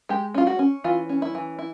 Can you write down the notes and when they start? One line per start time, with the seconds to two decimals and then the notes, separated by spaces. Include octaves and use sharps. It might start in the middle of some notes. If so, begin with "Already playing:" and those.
0.09 G#3 G4
0.34 C#4 F4
0.47 F#4
0.59 C#4
0.84 E3 F4
1.09 C#4
1.22 E4
1.35 E3
1.59 E4